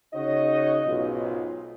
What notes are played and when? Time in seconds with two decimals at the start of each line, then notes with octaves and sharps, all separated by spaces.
0.14 C#3 D#4 F#4 C#5 D#5
0.85 B1 G#2 F4